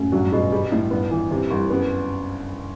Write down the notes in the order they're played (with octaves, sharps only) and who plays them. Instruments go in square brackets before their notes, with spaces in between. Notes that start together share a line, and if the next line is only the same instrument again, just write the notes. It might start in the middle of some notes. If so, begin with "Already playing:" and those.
Already playing: [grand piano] F#2 A2
[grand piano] G2 [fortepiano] F#3
[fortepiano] B2
G3
A2
[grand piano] G2 [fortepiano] B3
[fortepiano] E3
C3
C2
[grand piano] F#2 [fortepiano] B3